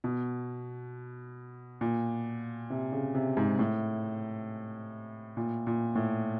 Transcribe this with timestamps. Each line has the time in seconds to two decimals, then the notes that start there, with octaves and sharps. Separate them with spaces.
0.04 B2
1.81 A#2
2.70 C3
2.92 C#3
3.15 C3
3.37 G#2
3.59 A2
5.37 A#2
5.67 A#2
5.95 A2